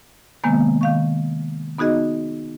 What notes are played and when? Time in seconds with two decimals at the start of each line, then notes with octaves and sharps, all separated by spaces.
0.44 C3 D#3 G#3 A#3 B3
0.81 D#3 F5 C#6
1.78 B3 D#4 F#4 G#4 D#5